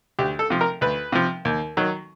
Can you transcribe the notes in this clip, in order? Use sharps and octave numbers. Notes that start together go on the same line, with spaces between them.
D2 G4
A4
C3 F3
A#4
D2 B4
C3 F3
D#2
D#3 F#3